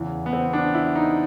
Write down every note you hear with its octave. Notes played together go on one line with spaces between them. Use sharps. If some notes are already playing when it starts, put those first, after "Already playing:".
Already playing: E2 C#3 E3
B3
C4
D4
E4
D#4